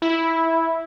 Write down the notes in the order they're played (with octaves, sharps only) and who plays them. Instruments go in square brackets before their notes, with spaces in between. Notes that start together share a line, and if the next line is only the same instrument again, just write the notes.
[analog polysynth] E4